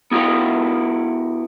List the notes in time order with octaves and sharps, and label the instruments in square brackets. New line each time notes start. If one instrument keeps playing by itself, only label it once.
[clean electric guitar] B3 E4 F#4 G4 F5